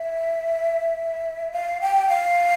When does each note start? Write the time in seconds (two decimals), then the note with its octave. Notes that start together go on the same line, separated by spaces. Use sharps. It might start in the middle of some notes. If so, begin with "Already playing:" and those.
Already playing: E5
1.53 F5
1.81 G5
2.09 F5